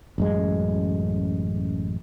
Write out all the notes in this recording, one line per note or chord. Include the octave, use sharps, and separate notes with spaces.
A1 F#2 G#3